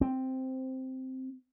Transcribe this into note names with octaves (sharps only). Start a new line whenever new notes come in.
C4